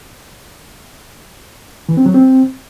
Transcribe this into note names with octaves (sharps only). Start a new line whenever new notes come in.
E3
C4
F#3
C4